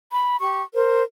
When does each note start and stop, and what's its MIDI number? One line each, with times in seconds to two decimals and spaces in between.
0.11 0.36 83
0.40 0.62 67
0.40 0.62 85
0.73 1.02 70
0.73 1.02 72